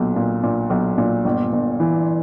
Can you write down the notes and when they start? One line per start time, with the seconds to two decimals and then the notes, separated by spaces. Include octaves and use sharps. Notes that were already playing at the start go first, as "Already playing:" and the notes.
Already playing: B1 A#2
0.16 A#2
0.43 A#2
0.70 B1
0.98 A#2
1.25 G1
1.53 G1
1.80 E3